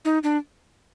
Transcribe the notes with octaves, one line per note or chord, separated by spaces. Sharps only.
D#4
D4